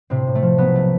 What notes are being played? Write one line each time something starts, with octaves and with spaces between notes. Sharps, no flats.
A2 C3 C4
A2
A3
F3
B1 B3
A3